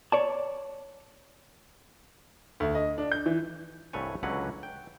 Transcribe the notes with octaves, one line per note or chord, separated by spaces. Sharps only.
C#5 D5 A5
D2
D#5
D4
G6
E3
C2 G2 A3 B4 C#5 G#5
C#2 D3 F#3 C#4 B4 F#5
G5